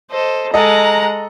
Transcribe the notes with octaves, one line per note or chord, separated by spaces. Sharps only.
A4 C5 D#5
G#3 A4 D#5 F#5 A#5